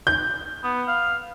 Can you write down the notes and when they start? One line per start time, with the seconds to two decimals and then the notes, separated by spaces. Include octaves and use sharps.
0.07 G6
0.64 B3
0.88 F5